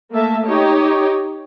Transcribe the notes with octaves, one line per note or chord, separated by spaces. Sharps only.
A3 A#3 A4 E5 A5
D#4 G4 C#5